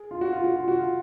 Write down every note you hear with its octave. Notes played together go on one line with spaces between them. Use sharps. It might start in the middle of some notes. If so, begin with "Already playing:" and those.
Already playing: G#4
F4
F#4
F4
F#4
F4
F#4
F4